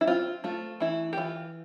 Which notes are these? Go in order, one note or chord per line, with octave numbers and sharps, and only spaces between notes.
E4
C4 F4
A3 F4
E3 E4
G4
E3 F4